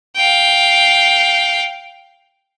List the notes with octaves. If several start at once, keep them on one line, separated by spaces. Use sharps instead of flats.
F5 G5